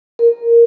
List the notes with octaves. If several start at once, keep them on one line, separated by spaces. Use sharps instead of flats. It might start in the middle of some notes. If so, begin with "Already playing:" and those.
A#4